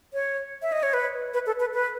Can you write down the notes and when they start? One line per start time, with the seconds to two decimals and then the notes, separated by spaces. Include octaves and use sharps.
0.14 C#5
0.62 E5
0.72 D#5
0.83 C#5
0.94 B4
1.34 B4
1.46 A4
1.60 B4
1.74 B4